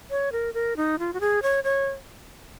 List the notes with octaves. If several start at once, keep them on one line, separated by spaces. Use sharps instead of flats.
C#5
A#4
A#4
D#4
F4
F#4
G#4
C#5
C#5